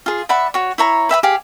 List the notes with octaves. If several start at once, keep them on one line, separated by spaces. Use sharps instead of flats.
F4 G#4
D5 E5 F#5 B5
F#4 C#5
E4 C#5 A#5
B4 E5 G5 B5
G4 G#4 F5